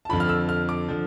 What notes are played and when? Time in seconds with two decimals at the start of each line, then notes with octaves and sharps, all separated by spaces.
0.05 A5
0.09 F2 D3 F3 B5
0.20 F6
0.29 E6
0.49 F6
0.69 D6
0.88 D3 F3